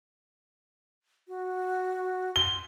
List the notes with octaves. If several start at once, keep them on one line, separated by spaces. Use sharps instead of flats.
F#4
C6 G7